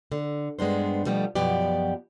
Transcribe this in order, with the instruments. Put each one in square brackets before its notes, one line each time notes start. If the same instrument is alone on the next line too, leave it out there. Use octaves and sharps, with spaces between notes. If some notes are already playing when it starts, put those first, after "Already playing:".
[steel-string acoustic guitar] D3
G2 G#3 B3 D4 C5
B2 D#3 F3 G3 A3 B3
F#2 B2 F3 B3 G4 D5